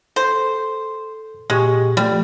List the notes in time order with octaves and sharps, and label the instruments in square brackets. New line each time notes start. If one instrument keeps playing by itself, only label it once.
[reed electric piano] A4 [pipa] C5
[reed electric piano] A#2 G4 C#6 [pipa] G#3
[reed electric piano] F3 A3 [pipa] G3